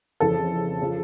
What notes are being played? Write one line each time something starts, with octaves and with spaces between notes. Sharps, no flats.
F2 C#3 E3 A4
C#3 F3